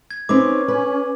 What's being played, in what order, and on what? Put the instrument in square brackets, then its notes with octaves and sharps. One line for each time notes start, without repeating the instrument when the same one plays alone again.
[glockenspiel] G#6
[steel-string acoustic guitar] C4 D#4 B4 [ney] C#4 [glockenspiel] D6
[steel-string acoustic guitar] B4